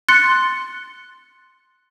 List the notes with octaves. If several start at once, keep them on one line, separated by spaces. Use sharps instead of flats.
C6 F#6 A6 C#7